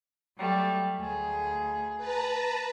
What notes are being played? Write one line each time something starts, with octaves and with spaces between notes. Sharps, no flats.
F#3 G3 A3
D2 G#4
B4 A5 A#5